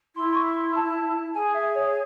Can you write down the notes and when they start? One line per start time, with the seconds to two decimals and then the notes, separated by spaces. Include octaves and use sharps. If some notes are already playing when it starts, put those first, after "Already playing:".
0.16 E4 C6
0.32 C6
0.35 C#6
0.56 C6
0.76 A5
1.35 G#4 G#5
1.54 E5
1.75 C#5